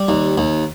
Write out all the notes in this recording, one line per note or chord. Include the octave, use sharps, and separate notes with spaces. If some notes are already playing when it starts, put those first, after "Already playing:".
Already playing: G3
D#2
D#2